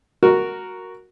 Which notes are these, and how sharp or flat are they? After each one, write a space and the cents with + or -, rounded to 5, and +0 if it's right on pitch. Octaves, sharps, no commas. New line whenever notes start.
F#4 +0 A#4 +0